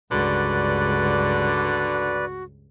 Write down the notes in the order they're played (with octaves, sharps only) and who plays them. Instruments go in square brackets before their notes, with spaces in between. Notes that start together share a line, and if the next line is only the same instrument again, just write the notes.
[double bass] C#2 G2 [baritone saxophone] D3 [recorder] F#4 [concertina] B4 D5